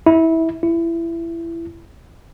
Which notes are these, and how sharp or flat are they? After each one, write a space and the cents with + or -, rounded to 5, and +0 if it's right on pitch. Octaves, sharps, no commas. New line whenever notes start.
E4 -20
E4 +20